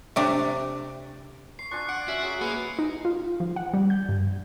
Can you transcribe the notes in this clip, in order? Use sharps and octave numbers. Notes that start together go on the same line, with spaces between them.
C3 A3 D4
C#6 C7
D4 F4 G#5 C#6
F#5 F#6 D7
C#4 F#4 E5
F#3 G#4
A#3 B3 G#4 C7 C#7
D#4
F4
F3
F#5
G3
G6
G2